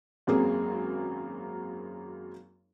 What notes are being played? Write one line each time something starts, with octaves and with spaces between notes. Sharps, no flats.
G#1 F#2 F#3 A#3 C4 G#4